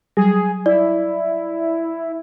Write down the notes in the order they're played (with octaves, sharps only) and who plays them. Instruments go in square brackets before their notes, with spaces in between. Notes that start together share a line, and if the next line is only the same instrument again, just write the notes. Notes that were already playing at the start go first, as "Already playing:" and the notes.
[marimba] F#3 G3 [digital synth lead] G#4
[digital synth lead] E4 [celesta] D5